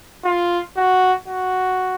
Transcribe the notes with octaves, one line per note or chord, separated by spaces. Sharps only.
F4
F#4
F#4